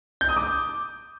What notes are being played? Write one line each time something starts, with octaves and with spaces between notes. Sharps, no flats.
G6
D#6
D6